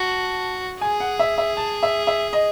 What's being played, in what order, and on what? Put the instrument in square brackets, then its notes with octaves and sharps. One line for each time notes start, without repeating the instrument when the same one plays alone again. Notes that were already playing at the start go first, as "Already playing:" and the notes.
Already playing: [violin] F#4 [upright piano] A5
[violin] G#4 [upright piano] G#5
[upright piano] F#5
E5
E5
A5
E5
E5
D#5